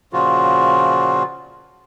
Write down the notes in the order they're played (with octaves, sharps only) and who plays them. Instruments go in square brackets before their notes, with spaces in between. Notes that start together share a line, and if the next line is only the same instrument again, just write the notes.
[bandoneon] A#2 C#3 F3 F4 F#4